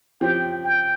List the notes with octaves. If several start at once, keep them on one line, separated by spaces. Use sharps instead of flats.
F3 C4 G4 G5
G5